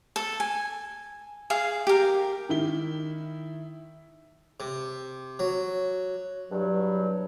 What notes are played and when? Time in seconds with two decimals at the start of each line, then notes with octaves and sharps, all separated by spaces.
0.16 A4
0.40 G#5
1.50 G#4 F5
1.87 G4 A#4
2.49 D#3 E4 G7
4.60 C3
5.39 F#3
6.50 E2 G2 B2 F#3